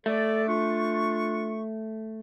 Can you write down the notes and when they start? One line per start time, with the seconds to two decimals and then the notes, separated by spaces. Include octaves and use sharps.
0.06 A3 A4 D5
0.48 D4 F4 C#6